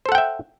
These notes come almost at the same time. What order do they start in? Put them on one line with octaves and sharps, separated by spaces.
C5 A4 F#5 G5 E5